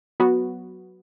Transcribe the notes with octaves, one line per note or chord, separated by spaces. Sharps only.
F#3 B3 F#4